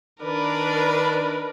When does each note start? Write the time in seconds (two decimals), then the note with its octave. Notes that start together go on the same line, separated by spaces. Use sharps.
0.22 D#3 D4 A#4 B4 D5